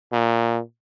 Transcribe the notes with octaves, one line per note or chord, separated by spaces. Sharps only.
A#2